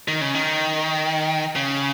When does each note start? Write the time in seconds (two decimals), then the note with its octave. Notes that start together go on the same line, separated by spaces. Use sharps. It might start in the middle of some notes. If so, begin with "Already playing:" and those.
0.08 D#3
0.21 C#3
0.35 D#3
1.56 C#3